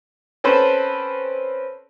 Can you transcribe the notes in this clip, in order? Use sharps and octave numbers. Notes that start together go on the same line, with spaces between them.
C4 C#4 A4 B4 C5